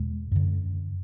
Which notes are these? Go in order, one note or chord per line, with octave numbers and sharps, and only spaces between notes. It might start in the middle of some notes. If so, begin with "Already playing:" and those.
Already playing: E2 B2 G#3
F#2 D3